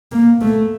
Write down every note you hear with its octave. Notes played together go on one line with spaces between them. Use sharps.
A#3
A3